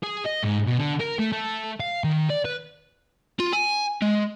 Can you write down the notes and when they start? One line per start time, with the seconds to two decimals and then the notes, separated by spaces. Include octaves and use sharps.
0.04 G#4
0.26 D#5
0.44 G#2
0.67 B2
0.80 D3
1.00 A#4
1.19 A3
1.32 A3
1.80 F5
2.04 D#3
2.30 D5
2.45 B4
3.40 F4
3.53 G#5
4.02 G#3